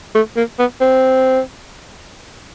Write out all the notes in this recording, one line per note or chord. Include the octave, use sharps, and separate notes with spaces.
A3
A#3
B3
C4